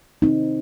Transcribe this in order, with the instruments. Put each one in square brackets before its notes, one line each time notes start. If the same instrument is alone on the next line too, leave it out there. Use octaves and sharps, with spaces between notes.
[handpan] C4 D#4